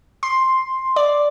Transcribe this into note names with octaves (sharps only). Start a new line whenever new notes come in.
C6
D5